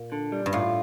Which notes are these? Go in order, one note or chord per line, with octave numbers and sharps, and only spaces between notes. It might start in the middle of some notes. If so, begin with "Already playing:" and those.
Already playing: A#2
D3
G3
G2
A2 F4